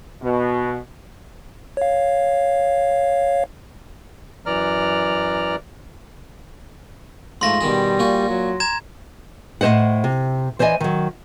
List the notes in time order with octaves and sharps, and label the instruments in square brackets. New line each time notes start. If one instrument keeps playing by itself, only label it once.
[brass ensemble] B2
[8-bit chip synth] C#5 F5
[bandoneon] F#2 E3 D5 A#5 F6
[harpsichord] G#2 F3 A3 [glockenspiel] C6 A#6
[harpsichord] B2 D#3 G#4 [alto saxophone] G3
[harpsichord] A#2 F#4 G#5
[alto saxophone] F#3
[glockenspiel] A#5 G#6 E7
[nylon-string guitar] A2 C#4 C5 D#5 F#5
C3
E3 C5 D5 D#5 G#5
D#3 F#3